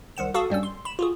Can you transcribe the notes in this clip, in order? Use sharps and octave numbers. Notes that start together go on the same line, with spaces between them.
C2 D#3 F#5 E7
F#4 A4 F5 A5 C#6 D#6
G2 G3 C#4 E6
C6
B5 E7
F4 F#4 G#4